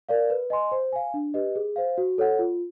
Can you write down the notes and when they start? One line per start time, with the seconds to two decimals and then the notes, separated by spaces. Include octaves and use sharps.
0.09 A#4 D5 F5
0.30 B4
0.50 D#5 G#5 C6
0.72 C5
0.93 F5 G#5
1.14 D4
1.34 G4 B4 D#5
1.56 G#4
1.76 C5 F5
1.98 F#4
2.18 A4 C#5 F#5
2.39 F4